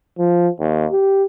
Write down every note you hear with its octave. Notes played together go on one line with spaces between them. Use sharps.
F3
D#2
G4